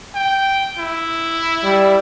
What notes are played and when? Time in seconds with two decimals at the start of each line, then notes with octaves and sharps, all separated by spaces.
0.15 G5
0.78 E4
1.64 G3